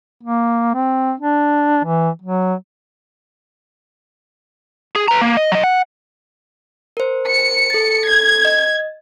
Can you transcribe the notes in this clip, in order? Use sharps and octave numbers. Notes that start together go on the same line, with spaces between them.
A#3
C4
D4
E3
F#3
G#4
B4 A#5
A#3
D#5
F#3 D#5
F#5
A#4 C5
C#7
A4 A6
G#6
D#5